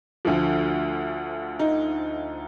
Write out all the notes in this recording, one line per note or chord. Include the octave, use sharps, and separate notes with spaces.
D2 D3 F3
D#4